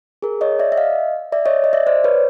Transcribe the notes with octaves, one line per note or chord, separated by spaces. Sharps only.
G#4 A#4
C#5 D#5
D5 E5
E5
D#5 F5
D5 E5
C#5 D#5
D#5
D5 E5
C5 D5
B4 C#5